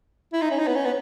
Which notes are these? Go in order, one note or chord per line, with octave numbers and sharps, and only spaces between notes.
E4
D#4
C#4
D#4
B3
C#4
B3